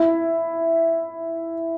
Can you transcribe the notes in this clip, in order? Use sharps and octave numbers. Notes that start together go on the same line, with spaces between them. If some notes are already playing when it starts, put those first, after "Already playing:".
Already playing: E4